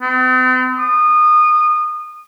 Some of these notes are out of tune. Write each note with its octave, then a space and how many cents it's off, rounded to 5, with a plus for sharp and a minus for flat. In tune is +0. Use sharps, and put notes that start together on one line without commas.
C4 -45
D#6 -25